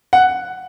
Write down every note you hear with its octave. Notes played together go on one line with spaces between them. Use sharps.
F#5